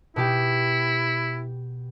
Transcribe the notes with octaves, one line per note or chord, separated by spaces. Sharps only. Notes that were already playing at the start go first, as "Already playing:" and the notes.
B2 E4 G4